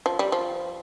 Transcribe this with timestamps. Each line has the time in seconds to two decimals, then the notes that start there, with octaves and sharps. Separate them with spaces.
0.06 F3
0.19 G3
0.32 F3